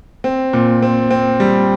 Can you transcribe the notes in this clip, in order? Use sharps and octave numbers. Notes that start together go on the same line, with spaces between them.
C4
A#2
C4
C4
G3